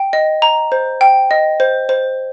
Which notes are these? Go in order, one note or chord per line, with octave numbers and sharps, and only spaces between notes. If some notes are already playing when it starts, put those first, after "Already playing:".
Already playing: G5
D#5
A#5
C5
G5
D#5
C5
C5